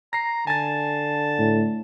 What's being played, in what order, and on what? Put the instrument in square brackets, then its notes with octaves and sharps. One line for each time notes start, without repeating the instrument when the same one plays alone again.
[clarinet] A#5 [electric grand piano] A#6 C7
[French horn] D3 [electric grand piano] G#5 A6 [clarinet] A5
[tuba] A2